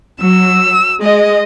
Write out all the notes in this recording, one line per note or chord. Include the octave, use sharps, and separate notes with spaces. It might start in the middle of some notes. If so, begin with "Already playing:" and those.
F#3 E6
G#3 D#5